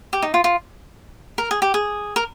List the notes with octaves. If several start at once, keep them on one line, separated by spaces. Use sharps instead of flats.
G4
D#4
F4
F4
A#4
G#4
G4
G#4
A#4